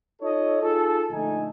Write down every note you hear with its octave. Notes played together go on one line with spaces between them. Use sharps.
D#4 F4 A4 C#5 D#5
D#4 F4 G#4 A4
A#1 D3 A3 D#4 A4 G#5